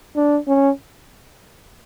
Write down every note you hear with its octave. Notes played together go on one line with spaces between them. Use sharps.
D4
C#4